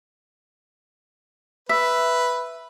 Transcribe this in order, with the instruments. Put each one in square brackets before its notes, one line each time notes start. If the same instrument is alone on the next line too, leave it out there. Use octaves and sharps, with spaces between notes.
[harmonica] B4 [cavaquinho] E5